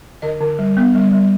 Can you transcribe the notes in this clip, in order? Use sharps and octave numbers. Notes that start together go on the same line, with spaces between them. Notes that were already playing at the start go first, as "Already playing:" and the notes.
D3 D#5
D3
G3
B3
G3
G3